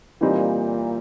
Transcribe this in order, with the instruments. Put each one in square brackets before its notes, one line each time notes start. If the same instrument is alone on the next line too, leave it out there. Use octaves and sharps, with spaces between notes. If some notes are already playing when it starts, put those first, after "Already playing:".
[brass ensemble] A#2 [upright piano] E3 G3 C4 D#4